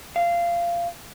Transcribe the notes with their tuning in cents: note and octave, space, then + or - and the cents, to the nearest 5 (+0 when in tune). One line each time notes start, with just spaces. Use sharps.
F5 -20